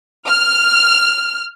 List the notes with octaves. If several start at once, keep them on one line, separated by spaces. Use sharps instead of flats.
F6